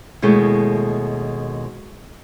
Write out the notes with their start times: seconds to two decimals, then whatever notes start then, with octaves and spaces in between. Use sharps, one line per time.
0.22 D#2 B2 G#3 A3 E4 C#5